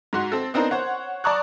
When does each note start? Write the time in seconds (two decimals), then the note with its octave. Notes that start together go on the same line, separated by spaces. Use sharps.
0.13 G#2 F#4 C6
0.32 C4 A4
0.54 B3 C4 D4 D#4 A#4 C5
0.71 C5 C#5 F#5
1.24 D5 A5 A#5 C#6 D#6 F#6